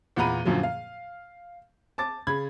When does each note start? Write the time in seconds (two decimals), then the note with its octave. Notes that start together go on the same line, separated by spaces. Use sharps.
0.16 E2 A#2 F#5 A#5 B5 D#7
0.45 F#2 A#2 D3 F3 F#3
0.63 F5
1.98 A5 D6 A6
2.27 C#3 B5 G#6